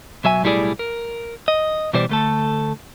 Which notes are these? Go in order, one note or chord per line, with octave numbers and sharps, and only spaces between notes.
B1 F#3 E5 G#5
B1 A2 G3 E4 G#4 D5
A#4
D#5
B2 E3 G3 C5 D5
D2 A3 A4